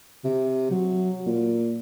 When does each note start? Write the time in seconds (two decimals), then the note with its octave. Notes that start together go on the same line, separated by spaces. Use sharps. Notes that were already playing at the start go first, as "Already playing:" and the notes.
0.24 C3
0.71 F#3
1.26 A#2